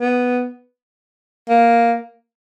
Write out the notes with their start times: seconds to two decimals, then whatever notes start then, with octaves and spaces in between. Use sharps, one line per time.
0.01 B3
1.49 A#3